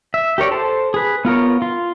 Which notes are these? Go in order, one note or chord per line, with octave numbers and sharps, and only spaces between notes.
E5
G4 A#4 C#5 D5
A4 C5 A5
G#4 B4
B3 F4 A#4 C#5
F4